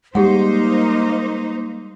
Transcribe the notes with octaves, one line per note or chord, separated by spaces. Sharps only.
G3 G#3 A#3 D#4 G4 G#4 C5 F#5